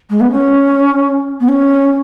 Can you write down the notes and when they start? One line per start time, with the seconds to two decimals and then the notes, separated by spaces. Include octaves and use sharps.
0.10 G#3
0.20 B3
0.31 C#4
1.40 B3
1.48 C#4